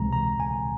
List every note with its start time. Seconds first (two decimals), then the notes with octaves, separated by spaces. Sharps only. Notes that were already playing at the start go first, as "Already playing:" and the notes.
Already playing: C#2 C3 E3 G#3 A#5
0.13 A#5
0.40 G#5